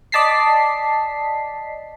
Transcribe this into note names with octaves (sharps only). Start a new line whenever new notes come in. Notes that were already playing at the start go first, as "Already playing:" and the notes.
D5 D#5 A5 B6 C7